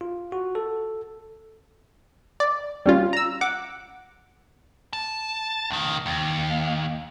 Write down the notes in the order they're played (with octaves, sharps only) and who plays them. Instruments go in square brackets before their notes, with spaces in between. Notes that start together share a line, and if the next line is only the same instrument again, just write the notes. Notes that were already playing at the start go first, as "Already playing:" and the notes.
[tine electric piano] F4
F#4
A4
[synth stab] D5
G3 C#4 F4
A#5 E6
F#5 D6
[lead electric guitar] A5
C#2 D#3
D#2